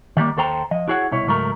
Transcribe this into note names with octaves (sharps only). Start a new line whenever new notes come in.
D#3 G3 A3 A#3
D#2 A4 C5 G5 A#5
F3 D#5
E4 F#4 G#4 C#5 F#5
C2 B2 E4 C#5
C#2 G#2 F#3 A3 A#4